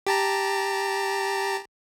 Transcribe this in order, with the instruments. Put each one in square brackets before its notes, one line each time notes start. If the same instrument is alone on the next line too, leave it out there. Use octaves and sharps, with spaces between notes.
[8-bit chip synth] G4 A5 A#5